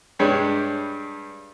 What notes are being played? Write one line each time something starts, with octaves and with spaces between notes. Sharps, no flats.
G2 G3 G#3 D4 C#5